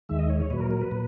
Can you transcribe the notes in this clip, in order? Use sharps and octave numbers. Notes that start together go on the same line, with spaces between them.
D#2 D#3 G#3 E5
D#5
C#5
C#5
A#2 F#3 B4
A#4
A#4
B4
A#2